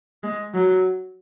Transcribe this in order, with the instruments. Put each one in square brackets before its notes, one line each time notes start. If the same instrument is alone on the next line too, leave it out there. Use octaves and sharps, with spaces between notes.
[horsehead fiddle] G#3
F#3